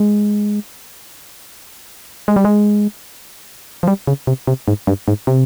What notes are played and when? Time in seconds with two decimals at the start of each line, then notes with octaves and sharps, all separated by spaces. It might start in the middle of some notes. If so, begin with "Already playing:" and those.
Already playing: G#3
2.28 G#3
2.36 G3
2.45 G#3
3.83 F3
3.88 G3
4.07 C#3
4.27 C3
4.47 C3
4.68 G#2
4.87 G2
5.08 G#2
5.27 C3